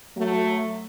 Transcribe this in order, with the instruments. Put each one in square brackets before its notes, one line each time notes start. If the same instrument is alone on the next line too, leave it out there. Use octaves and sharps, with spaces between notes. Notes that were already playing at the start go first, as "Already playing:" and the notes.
[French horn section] F#3 A3